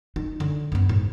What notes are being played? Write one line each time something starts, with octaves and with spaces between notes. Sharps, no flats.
D#4
D3
F#1 B3
G#2